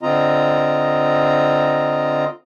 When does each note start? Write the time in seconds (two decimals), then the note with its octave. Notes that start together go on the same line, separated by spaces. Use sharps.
0.02 D3 C4 F4 D#5 A#5